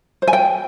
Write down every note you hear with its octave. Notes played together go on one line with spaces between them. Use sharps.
C5
G#5
G5